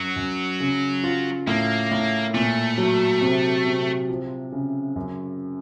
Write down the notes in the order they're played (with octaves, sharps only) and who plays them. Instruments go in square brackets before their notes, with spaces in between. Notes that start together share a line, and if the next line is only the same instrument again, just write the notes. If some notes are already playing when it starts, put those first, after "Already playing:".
Already playing: [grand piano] F#2 [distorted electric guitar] F#3
[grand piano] F#2
C#3
F4
[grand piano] A2 [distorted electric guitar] A#3
[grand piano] A2
[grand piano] A#2 [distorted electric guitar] A3
[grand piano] F#3
C3
C3
F3
C#3
F#2